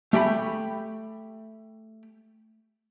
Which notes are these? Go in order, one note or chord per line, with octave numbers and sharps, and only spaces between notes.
A3 G4 G5 B5